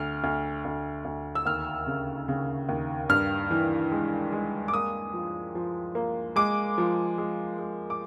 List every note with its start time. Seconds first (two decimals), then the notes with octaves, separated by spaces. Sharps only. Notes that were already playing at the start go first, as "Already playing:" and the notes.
Already playing: D2 F6
0.24 D2
0.65 D2
1.05 D2
1.35 E6
1.46 D#2 F6
1.87 C#3
2.28 C#3
2.69 D#2
3.09 G2 F6
3.51 E3
3.92 G#3
4.32 G#3
4.68 D6
4.73 A#3 D#6
5.13 F3
5.55 F3
5.95 A#3
6.36 G#3 D6
6.78 F3
7.18 G#3
7.59 G#3
7.90 D6